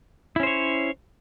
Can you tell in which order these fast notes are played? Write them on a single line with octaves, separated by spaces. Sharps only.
E4 C#4 C5 C#5